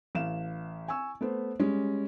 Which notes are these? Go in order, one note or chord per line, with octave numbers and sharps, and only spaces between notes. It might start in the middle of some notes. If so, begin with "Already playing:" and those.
A1 F5 E7
G#5 C#6 E6
A3 B3 C5
G3 G#3 C#4